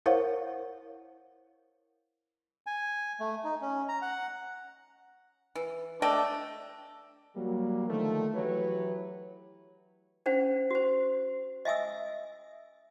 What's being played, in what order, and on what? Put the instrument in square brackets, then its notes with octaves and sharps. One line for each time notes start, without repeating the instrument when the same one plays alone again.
[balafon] E4 A#4 C5 C#5 F5 F#5
[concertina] G#5
A3
D#4
C#4
A#5
F#5
[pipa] E3
[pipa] A3 D#5 G5 [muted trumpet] D4
[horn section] F#3 G3 A#3
D3 D#3 F3 A3
E3 F#3 E4 G4 B4 C#5
[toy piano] C#4 D4 C5 F#5
F#4 C5
D#5 E5 G#5 D#6 E6